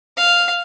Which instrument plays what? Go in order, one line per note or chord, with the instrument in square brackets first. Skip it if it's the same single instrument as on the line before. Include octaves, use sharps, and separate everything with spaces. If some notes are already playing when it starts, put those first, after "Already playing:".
[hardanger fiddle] F5